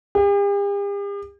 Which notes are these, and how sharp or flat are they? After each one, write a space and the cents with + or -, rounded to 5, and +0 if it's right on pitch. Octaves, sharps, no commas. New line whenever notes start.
G4 +45